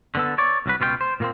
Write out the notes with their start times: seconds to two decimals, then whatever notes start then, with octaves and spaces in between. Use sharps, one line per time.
0.15 D3 B3 A4
0.38 C#5 D5
0.66 C2 F#3 B4
0.80 C#2 B2 F4 G4 G5
1.01 C5
1.20 A#2 A#3 C4